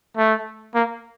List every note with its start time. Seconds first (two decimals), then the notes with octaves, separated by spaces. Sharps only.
0.17 A3
0.75 A#3